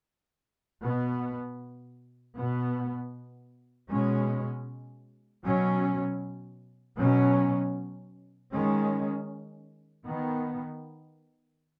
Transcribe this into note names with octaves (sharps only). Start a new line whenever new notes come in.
B2 B3
B2 B3
B2 G#3 C#4
B2 F#3 C#4
B2 F#3 C#4
D#3 G#3 C#4
D#3 B3